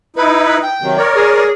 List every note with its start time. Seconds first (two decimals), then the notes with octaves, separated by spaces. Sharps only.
0.16 D#4 E4 B4
0.62 G5
0.82 C3 D#3 F#3
0.97 A#4 C#5 D5
1.15 G#4